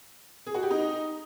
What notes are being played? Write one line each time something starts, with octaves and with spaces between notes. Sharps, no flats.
G#4
F#4
G4
D#4